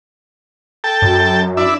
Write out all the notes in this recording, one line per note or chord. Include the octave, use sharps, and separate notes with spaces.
A4 G5 A5
F#2
D4 E4 E5